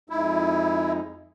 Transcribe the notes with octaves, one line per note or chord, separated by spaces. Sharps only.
F2 G#3 D#4 E4